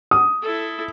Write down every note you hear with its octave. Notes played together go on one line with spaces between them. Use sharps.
D#6
E4 A4